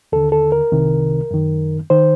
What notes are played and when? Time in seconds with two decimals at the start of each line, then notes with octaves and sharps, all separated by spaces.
0.12 D#2 D3 A4
0.32 A4
0.52 A#4
0.72 C2 C3 D#3
1.31 F#2 D#3
1.90 D#3 C5